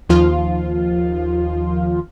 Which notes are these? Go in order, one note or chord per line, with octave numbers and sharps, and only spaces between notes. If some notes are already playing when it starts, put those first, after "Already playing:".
D#2 F3 F4